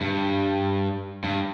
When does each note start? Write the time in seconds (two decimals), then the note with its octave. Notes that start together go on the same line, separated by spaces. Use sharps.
0.01 G2
1.24 G2